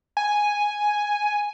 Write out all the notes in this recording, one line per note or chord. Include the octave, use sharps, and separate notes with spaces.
G#5